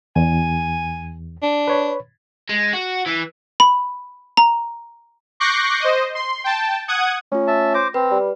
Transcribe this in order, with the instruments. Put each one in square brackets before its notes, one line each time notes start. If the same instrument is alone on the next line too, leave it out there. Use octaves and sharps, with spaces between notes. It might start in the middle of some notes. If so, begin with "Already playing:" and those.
[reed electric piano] E2 [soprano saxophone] G#5
[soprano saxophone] D4
[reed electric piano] B4 C#5 B5
[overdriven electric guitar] G#3
F#4
E3
[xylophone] B5
A#5
[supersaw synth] C#6 D6 F#6 G6 A#6 C7
C5 D#5
C6
G5 A5
F#5 D#6 G#6
[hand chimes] A3 F4 [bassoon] C#4
[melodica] E5 A5
[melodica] C5 D6 [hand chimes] A#6
[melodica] C4 [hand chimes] B4
[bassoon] G3